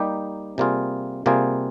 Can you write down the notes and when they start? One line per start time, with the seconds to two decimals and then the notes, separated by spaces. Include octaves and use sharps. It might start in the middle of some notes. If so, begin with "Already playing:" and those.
Already playing: G3 A#3 D#4 G4
0.58 C3 G3 A#3 F4 G#4
1.26 C3 G3 A#3 F4 G#4